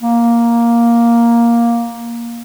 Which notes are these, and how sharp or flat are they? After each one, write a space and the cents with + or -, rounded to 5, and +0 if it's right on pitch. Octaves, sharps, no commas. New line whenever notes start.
A#3 +5